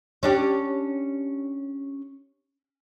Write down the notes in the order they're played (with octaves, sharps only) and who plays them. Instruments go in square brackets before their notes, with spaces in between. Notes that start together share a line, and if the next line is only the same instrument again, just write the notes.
[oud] C#4 D4 G4